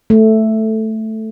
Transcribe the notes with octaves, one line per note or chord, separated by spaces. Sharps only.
A3